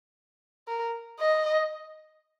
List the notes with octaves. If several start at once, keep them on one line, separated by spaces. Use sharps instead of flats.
A#4
D#5